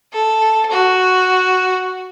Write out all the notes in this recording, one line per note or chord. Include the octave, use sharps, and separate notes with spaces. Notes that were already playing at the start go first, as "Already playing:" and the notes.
A4
F#4